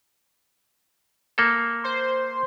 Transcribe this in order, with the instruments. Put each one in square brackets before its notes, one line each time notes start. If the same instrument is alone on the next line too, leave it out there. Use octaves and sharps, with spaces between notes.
[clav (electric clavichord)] A#3 A4
[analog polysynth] C5 C6